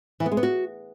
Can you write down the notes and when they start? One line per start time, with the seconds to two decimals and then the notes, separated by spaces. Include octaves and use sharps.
0.20 E3
0.26 B3
0.32 G#3
0.37 B3
0.43 F#4